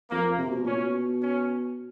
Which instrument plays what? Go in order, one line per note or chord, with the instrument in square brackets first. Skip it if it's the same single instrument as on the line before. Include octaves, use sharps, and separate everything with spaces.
[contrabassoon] F2 [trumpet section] A#3
[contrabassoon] C3
B2
[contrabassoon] A#2 [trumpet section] C#4
[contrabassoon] B2
[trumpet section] C#4